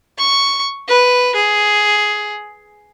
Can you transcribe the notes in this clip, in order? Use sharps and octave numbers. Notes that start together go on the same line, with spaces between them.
C#6
B4
G#4